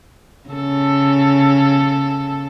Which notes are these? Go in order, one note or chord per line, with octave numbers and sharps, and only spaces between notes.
C#3 A4